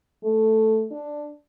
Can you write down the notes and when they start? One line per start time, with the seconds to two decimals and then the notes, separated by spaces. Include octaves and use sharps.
0.24 A3
0.91 D4